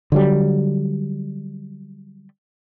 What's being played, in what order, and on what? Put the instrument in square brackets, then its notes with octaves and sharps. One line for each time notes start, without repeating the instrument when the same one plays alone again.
[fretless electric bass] D3 F#3 G3